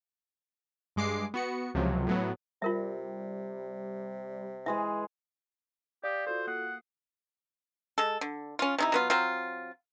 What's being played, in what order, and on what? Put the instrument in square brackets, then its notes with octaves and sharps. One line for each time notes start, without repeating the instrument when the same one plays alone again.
[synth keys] G2 G#3 D6 C7
B3 F#4 C#7
C#2 C3 F3 F#3
A2 F#3 B3
[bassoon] C3 [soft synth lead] G3 [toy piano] F4 A#4 E5
[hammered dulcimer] E3 G#3 G#4 [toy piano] E5
[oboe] G4 [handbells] D5 F5 D#6
[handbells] F4 F#4 A4 [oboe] C5
[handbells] A#3 D#6 C7 [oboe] F#5
[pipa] G#3 A4
D3
C#4 F4
C3 D#4 E4
F#3 B3 F4
F#3 C4 F4